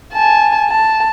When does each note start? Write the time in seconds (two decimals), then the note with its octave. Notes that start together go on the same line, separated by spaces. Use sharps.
0.13 G#5 A5
0.69 A5